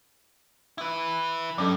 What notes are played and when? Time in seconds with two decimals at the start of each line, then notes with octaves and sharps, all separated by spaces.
0.78 E4 B4
1.58 G2 F#3 C#4 A4